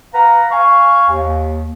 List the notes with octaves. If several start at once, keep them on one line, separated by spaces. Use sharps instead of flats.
B4 F5 F#5 A#5
F5 G#5 C#6
D#2